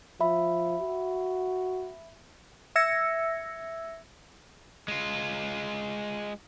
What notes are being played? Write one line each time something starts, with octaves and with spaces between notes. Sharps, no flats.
F3 E5 B5
F#4
E5 E6 G#6 A#6 C#7
G#3 F4